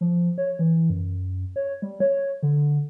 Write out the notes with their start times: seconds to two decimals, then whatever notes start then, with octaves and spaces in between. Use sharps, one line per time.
0.01 F3
0.38 C#5
0.59 E3
0.90 F#2
1.56 C#5
1.82 G3
2.00 C#5
2.43 D3